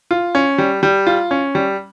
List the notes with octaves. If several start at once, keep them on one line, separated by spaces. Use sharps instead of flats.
F4
C#4
G3
G3
F4
C#4
G3